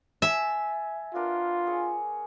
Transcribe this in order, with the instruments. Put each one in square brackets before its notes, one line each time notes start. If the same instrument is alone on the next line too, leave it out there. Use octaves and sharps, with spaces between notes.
[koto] E5 [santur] G#5 A5
[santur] B3 D4 A#4 [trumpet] F4
[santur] G#4 C#5